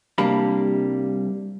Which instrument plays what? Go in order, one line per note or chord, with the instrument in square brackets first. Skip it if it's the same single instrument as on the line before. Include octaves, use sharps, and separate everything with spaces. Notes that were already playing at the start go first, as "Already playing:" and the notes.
[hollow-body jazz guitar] C2 G3 A#3 D4 A5 B5